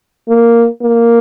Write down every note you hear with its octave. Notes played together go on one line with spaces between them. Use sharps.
A#3
A#3